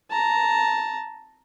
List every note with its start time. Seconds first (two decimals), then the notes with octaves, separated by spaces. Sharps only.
0.11 A5 A#5